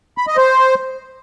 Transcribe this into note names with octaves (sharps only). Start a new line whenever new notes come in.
B5
D#5
C5